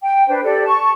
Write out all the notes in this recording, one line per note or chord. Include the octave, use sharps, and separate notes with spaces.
G5
D4 B4 C5
G4 A4 D5
A5 C#6